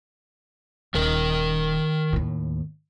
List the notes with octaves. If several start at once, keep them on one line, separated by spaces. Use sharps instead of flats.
D#1 D#3 A#4
D#2 A2